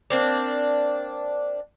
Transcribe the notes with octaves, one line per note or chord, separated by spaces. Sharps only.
A#3 C4 D4